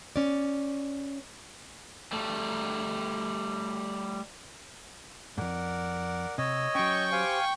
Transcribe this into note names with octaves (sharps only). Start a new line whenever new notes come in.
C#4 D5
G3 A3
F2 G#2 A#4 D5 F#5
C3 C#5 D#5 E6
F#3 C#4 G5 C#6
G4 C5 F5 G#5